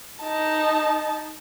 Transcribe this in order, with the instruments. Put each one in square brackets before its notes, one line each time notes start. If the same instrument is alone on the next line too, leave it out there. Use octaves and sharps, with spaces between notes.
[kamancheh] D#4 A5